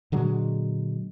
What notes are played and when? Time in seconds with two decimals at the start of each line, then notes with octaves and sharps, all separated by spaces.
0.12 A#2 D3 F#3 G#3